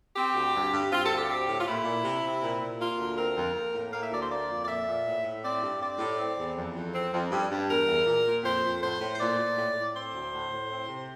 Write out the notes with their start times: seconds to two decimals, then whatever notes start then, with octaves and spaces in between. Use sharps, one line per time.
0.15 C4 G4
0.34 D2
0.54 G2
0.73 G2
0.91 C4 F4
1.04 A4
1.10 D2
1.17 G4
1.28 C4 G4
1.47 A2
1.59 F4
1.66 A#2 E4
1.85 A#2
2.03 C3
2.22 C3
2.42 A#2
2.60 A#2
2.79 A#3 F4
2.98 D2
3.16 C4 A#4
3.36 F2
3.55 A#3
3.74 A2
3.92 A#3 F5
4.02 E5
4.11 D2 D5
4.20 C5
4.29 A#3 D5
4.48 F2
4.63 D5
4.67 A#2 E5
4.86 A#2
5.06 A2
5.24 A2
5.42 C4 D5
5.62 G2
5.80 C4 D5
5.99 A2
6.18 C4
6.37 E2
6.55 F2
6.75 F2
6.94 C4
7.12 F2
7.31 G2
7.50 G2
7.68 E2 A#4
7.88 E2
8.06 A#2
8.26 A#2
8.44 F2 C5
8.62 F2
8.81 A2 C5
9.00 A2
9.15 C5
9.19 A#2 D5
9.38 A#2
9.56 A2
9.76 A2
9.94 C4 C5
10.13 D2
10.32 A2
10.51 A2
10.70 C4
10.88 C3